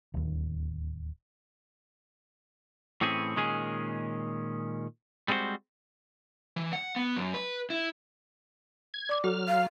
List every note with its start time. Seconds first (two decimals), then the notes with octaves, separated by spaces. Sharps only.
0.14 D1 D#2
3.01 A2 E3 C4 C#4 G#4
3.36 A#2 D#3 G#3 C#4 G#4
5.28 G3 G#3 C4 E4 F#4 C5
6.56 E3
6.73 F#5
6.96 B3
7.16 F#2
7.34 B4
7.70 E4
8.94 G#6
9.09 D5 D6
9.24 F#3 F#4 A4 F6
9.48 F5